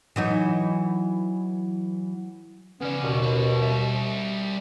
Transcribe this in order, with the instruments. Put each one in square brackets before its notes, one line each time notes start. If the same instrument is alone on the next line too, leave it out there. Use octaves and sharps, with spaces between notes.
[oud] E3 F#3 D#4
[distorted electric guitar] C#3 D5 [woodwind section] B3 C#4
[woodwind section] D#2 B2
[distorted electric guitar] C#4 B4
G3 E5